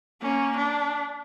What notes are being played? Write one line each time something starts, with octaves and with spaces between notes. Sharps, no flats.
A#3 C#4
D4